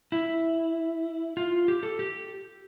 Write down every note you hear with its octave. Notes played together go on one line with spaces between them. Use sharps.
E4
F4
G4
A4
G4